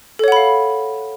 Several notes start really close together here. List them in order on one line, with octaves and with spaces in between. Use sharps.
A4 C#5 F#5 B5 F5